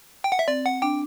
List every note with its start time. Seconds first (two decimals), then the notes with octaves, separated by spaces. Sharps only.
0.24 G5
0.32 F#5
0.39 E5
0.48 C4 D5
0.66 F#5
0.82 D4 G5